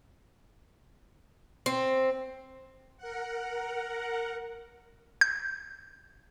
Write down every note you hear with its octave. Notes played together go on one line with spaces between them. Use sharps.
C4
A#4 F#5
G6